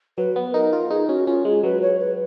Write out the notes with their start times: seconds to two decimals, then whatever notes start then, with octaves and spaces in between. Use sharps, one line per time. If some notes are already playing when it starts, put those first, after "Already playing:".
0.18 F#3 B4
0.36 B3
0.54 D#4 A#4
0.73 F4
0.90 D#4 G#4
1.08 C#4 F#4
1.27 C#4 F4
1.45 G#3 G#4
1.63 F#3 B4
1.82 C#5
2.00 B4